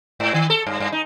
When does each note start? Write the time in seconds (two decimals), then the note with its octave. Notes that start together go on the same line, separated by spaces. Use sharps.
0.20 G#2
0.34 D#3
0.50 A4
0.67 G2
0.80 G2
0.92 D#4